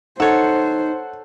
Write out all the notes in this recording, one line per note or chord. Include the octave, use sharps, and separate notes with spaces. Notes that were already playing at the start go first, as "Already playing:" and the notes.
D#4 A4 C5 C#5 F#5